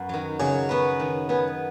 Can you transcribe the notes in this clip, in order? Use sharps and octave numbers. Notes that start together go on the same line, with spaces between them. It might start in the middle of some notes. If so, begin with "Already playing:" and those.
Already playing: F#2 B3 F#4
D#3 F#3
C#3 F#3
B3 F#4 B4
D#3
B3 G#4 B4